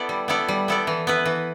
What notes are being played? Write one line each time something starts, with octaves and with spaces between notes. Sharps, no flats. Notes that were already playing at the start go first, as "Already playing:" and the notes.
Already playing: B3 E4 A4 D5
G3
B3 E4 A4 D5
G3
B3 E4 A4 D5
E3
B3 E4 B4
E3